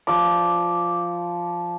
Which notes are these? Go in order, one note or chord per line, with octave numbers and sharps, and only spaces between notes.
F3 D5 D6